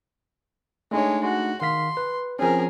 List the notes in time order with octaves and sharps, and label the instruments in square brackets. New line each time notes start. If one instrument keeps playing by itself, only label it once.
[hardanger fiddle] G#3 C#5 [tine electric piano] A3 D4 D#4
[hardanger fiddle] F#4
[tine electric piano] D#3 F5 B6 [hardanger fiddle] C6
[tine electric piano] B4
[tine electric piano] F3 C4 C#4 [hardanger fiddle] G#4 A#4